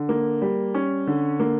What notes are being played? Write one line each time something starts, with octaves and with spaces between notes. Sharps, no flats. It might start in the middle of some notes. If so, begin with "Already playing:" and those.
Already playing: D3
A#3
G3
C#4
D3
A#3